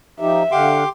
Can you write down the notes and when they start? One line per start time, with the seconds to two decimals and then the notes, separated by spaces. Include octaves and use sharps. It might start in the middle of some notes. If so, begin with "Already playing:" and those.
0.20 F3 D#4 G4 E5
0.52 D3 G4 F5 F#5 C6 D6